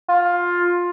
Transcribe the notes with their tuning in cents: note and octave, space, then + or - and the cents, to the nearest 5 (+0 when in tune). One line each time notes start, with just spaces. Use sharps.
F4 +10